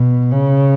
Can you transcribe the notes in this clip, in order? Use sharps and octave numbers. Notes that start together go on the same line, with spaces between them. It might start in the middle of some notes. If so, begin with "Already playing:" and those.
Already playing: B2
C#3